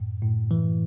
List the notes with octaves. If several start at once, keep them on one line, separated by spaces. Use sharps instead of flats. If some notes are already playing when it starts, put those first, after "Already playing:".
Already playing: F#2 A2
A2
E3